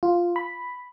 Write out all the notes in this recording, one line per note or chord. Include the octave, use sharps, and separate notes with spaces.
F4
B5